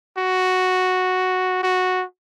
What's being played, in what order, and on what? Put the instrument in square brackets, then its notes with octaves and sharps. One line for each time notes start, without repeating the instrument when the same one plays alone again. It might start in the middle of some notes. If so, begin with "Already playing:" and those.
[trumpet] F#4
F#4